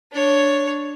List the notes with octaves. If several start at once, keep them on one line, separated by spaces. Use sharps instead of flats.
D4 C#5